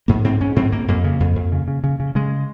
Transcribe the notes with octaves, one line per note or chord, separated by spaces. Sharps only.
G#2 A#3
G#2 C4
G#2 C#4
G#2 C4
G#2 A#3
F2 A#3
C#3
F2
F2
C#3
C#3
C#3
C#3
C#3 G#3